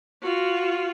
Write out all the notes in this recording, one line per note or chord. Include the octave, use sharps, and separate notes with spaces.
F4 F#4